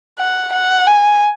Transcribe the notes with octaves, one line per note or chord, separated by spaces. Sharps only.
F#5
F#5
G#5